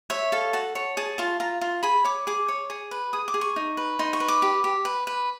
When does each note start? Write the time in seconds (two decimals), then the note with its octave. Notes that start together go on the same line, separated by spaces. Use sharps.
0.10 C#5 E5
0.32 A4 F5
0.53 F#4 A5
0.75 C#5
0.97 G#4 A5
1.18 F4 A5
1.40 F4 A#5
1.61 F4
1.83 G#4 B5
2.04 C#5 D6
2.27 G#4 D6
2.48 C#5
2.70 G#4
2.91 B4
3.13 G#4 D#6
3.28 D6
3.34 G#4
3.41 C#6
3.56 D#4
3.77 B4
3.99 D#4 C6
4.13 C#6
4.20 B4
4.28 D6
4.42 G4
4.64 G4
4.85 B4
5.07 B4